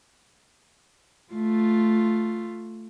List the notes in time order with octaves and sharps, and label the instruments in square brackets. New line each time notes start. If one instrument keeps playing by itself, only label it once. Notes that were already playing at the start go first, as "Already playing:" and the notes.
[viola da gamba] A3 F4